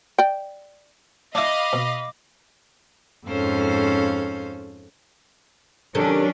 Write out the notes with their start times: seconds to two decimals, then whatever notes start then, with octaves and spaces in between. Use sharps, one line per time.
0.19 D5 G5
1.35 D4 E4 D#5 F5 B5 D6
1.73 B2
3.26 F2 G#2 C#4 A4 C5 F5
5.95 C3 D#3 F#3 C#4 D4 A4